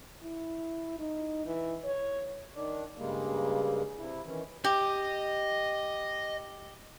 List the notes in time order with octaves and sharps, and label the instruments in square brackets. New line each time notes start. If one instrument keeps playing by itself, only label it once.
[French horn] E4
D#4
E3
C#5
[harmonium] D#3 D4
G2 C#3 G3 G#3 A#3
C3 E4
D#3 E3 C#4
[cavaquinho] G4 [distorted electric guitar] D#5